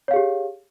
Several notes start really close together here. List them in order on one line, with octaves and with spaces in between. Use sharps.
C#5 F5 G#4 G4